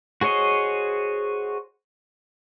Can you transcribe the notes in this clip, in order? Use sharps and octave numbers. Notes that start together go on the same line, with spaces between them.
F#4 G#4 C5 C#5 D#5